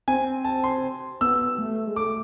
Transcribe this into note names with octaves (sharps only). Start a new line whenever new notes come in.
C4 G#5
A5
C6
B3 E6
A3
G#3
A3 D6